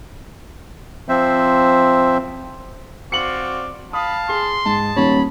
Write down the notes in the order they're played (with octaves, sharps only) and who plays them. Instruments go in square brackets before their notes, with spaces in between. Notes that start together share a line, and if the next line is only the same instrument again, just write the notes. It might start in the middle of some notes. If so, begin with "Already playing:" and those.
[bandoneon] F3 C4 C5 E5
[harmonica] C4 D5 F5 [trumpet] F#4 [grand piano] C#7 F#7
[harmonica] F5 A5 [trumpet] B5 [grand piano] D#6
[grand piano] G#4 [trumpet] C6
[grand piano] G#2 [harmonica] A5
[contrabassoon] D#1 [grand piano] C#5 [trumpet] B5